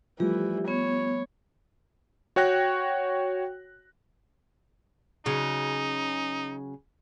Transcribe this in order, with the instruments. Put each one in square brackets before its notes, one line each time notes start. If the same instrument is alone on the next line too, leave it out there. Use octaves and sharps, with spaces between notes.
[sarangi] E3 [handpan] F3 G3 A3 [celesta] F4 [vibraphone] G4
[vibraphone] B3 [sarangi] C#5
[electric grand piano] F#4 C#5 G5 F#6 A#6
[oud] C#3 F#3 [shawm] D#4